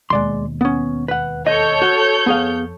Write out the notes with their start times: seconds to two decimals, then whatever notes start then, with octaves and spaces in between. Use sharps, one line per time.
0.10 E1 D#2 G#3 D5 C6
0.61 B3 C#4
1.08 B4 F#5
1.46 A4 C#5 D#5 G6
1.82 F#4
2.26 F2 B3 G#4 F5